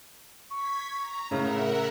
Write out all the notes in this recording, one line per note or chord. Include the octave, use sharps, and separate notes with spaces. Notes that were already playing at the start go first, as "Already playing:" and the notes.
C#6 G#6 B6
A#5
A2 C#3 A#4 E5 F#5 A#5